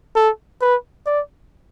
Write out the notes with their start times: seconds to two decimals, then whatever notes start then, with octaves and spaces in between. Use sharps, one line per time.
0.16 A4
0.62 B4
1.07 D5